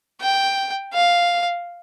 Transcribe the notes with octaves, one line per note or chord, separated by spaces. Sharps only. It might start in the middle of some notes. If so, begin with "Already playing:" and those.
G5
F5